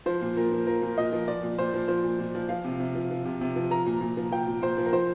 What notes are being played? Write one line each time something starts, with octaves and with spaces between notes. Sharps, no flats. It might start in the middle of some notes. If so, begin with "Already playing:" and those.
F3 C5
A#2
A#2 A#4
F3
F3 A#4
A#2
A#2 D#5
F3
F3 D5
A#2
A#2 C5
F3
F3 C5
A#2
A#2
F3
F3 F5
C3
C3
F3
F3
C3
C3
F3
F3 A#5
A#2
A#2
F3
F3 G5
A#2
A#2 C5
F3
A#4
F3 C5